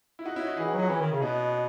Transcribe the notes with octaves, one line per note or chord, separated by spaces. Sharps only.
E4
D#4 F#4
C#4 E4
D#4 F#4
E3 E4 G#4
D#4 F#4
F#3
D#4 F#4
E3 C#4 E4
D#3
C#3
B2 B3 D#4